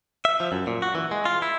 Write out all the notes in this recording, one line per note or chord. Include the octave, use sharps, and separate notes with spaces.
E5
F3
F#2
A#2
F#4
E3
G#3
F4
E4